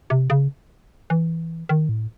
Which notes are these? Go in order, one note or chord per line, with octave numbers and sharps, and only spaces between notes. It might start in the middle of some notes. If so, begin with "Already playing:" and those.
C3
C#3
E3
D#3
A2